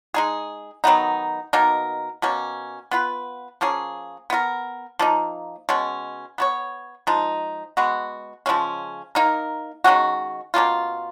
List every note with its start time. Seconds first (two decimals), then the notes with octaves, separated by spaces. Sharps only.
0.14 G#3 D#4 G#4
0.84 D#3 F#3 B3 D#4
1.53 B2 A#3 D#4 A#4
2.22 B2 A#3 C#4
2.91 B3 F4 B4
3.61 F3 A#3 C#4 G#4
4.30 B3 F4 A#4
4.99 F3 A#3 D#4
5.69 B2 G#3 C#4
6.38 B3 F#4 C#5
7.07 F3 G#3 D#4
7.77 G#3 B3 F#4
8.46 C#3 F3 G#3 C#4
9.15 A#3 D#4 A#4
9.84 D#3 G#3 C#4 F#4
10.54 B2 A#3 C#4 F4